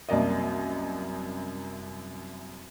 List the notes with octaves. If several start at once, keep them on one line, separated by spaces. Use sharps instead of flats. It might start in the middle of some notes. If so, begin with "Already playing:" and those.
C2 F#2 A#3 D5 D#5